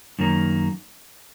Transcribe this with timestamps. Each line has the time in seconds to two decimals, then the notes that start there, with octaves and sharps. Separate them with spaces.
0.19 F#2 D#3 A#3